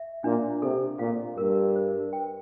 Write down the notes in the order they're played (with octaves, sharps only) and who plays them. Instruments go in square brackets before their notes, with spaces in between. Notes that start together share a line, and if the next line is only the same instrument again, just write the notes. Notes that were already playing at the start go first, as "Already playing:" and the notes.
Already playing: [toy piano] E5
[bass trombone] A#2 [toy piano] D4
[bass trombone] C3 [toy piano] A4
[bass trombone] A#2 [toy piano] F5
[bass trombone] G2 [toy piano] A#4
[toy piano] C5
G5